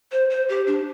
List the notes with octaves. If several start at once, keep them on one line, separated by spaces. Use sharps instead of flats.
C5
C5
G4
D4